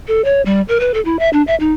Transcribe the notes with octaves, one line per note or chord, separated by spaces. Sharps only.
A4
C#5
G3
A#4
B4
A4
E4
E5
D4
E5
D#4